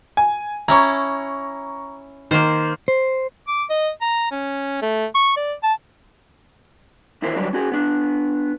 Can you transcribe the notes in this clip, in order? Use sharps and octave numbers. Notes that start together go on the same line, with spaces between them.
G#5
C#4 E4 A#5 C#6
D#3 A#3 C5
C5
D6
D#5
A#5
C#4
A3
C#6
D5
A5
D#2 E3 E4 F4 A#4 C5
D3 F#3 G3 F#4 B4 D5
C#4 F#4 G#4
B3 D4